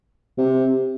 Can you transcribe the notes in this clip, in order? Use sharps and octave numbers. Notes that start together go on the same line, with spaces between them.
C3